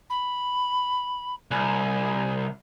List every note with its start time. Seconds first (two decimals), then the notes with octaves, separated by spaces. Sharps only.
0.10 B5
1.51 C2 G#5